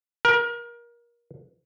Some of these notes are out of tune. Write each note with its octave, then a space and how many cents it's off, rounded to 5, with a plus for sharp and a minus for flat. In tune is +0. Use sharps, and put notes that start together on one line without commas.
A#4 +25